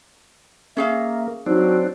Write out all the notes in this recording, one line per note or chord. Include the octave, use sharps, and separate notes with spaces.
A#3 C#4 G#4 E5 F5
F#3 C4 D4 D#4